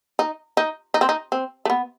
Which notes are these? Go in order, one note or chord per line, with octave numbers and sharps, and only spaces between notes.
D#4
D#4
D#4
C4
D#4
C4
A3
B3